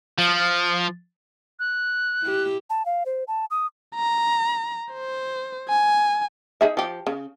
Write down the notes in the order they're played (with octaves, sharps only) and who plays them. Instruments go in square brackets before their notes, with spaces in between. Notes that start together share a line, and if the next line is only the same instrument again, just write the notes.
[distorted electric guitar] F3
[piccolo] F#6
[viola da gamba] E4 G4
[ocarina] A5
F5
C5
A5
D#6
[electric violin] A#5
C5
G#5
[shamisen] D#4 G#4 E5
F3 G4
C#3